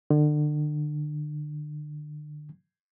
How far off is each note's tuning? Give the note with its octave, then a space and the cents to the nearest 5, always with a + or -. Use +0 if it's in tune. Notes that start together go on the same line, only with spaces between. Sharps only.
D3 +35